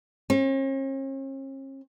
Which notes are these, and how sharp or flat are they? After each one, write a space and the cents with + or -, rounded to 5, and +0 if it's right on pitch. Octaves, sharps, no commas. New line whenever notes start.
C#4 -45